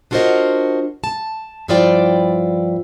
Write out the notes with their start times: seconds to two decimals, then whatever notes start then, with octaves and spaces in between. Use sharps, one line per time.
0.11 D4 F4 F#4 A#4 C5 D#5
1.04 A5
1.68 G2 F3 E4 F4 D5 G5